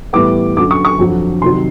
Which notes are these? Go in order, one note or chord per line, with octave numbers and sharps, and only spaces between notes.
A2 E3 G3 B3 D6
F#2 D3 F#3 D6
C#6
C#6
F2 D3 F#3
C3 D#3 F#3 C6